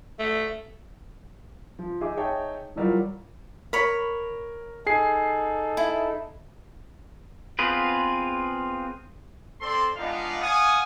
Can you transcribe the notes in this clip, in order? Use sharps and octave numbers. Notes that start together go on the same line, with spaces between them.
A3
F3
D#4 G#4 E5 D6
D#4 G#4 C#5 E5 G5 A5
E3 F#3 G3 F4 A#4
A#4 C#5 B5
D#4 G#4 A4 C7
E4
B3 C4 F4 G#4 B4
C4 A4 D5 C6
G#3 B3 D4 D#4 F4 F5
F5 F#5 G#5 D#6